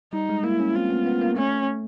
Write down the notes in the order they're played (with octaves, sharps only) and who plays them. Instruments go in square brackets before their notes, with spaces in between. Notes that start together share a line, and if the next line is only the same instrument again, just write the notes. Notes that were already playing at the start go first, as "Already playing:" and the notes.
[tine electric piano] G3 [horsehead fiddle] D#4
[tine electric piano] G#3
[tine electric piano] A#3 [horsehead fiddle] E4
[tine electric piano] C#4
[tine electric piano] C4 [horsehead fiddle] F4
[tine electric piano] B3
B3
A#3
[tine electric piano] A3 [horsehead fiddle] C#4